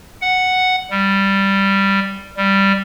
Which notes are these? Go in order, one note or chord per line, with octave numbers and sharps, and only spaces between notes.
F#5
G3
G3